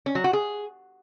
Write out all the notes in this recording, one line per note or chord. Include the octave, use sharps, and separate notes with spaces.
C#4
F#3
F#4
G#4